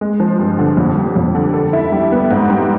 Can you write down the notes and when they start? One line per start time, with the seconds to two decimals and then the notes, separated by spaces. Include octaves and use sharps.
0.01 G#3
0.20 F3
0.39 G2
0.59 D3
0.77 F2
0.96 G3
1.16 F2
1.35 D3
1.54 A4
1.73 E4
1.92 G3
2.12 B3
2.31 G#2
2.50 G3